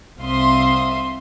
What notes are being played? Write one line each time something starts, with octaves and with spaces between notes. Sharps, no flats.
C2 C4 E5 F5 C6 D#6